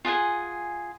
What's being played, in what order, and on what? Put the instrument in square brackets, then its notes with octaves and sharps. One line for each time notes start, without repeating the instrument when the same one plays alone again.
[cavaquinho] F4 G#4 F#5 G#5